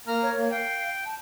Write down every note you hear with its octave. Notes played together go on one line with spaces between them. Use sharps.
A#3 A#5 F6
C#5
A#3
F5 G5
A5